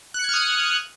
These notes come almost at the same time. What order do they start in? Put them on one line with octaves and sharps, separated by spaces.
F#6 C#7 G#6 F6 D#6